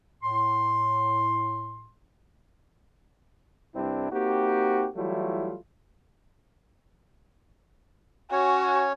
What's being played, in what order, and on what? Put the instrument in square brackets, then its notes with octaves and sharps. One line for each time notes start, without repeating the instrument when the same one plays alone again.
[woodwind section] A2 C6
[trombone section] C2 G2 G3 C4 D4 E4
A#3 C4 D#4 F#4 G4
E3 F#3 G3 A3 E4 F4
[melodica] C#4 C#5 [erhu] F#4 [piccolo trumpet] G#5